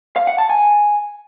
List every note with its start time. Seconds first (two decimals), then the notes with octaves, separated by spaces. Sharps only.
0.16 F5
0.27 F#5
0.38 A5
0.49 G#5